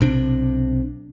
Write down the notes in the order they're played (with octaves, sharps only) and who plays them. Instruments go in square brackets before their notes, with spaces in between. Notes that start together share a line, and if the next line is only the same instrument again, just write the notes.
[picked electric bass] B1 C3 D4